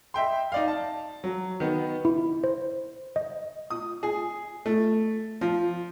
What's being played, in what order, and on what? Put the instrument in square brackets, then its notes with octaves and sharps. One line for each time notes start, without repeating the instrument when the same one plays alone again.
[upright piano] D#5 E5 G5 C6
D#4 D5 F5
A5
F#3
D#3 B3
[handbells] E4
C5
D#5
[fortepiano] D#6
G#4
A3
F3